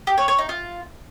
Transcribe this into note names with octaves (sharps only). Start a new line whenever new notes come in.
G4
C#5
C#5
D#4
F4